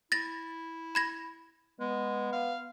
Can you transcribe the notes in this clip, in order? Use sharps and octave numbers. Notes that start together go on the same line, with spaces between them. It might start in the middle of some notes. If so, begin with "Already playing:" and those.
E4 A6 A#6
B5 G#6 A#6
G#3 B3
F5